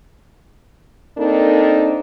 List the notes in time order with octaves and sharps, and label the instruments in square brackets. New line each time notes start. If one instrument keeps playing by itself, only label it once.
[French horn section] A#3 C4 D4 D#4 A4 A#4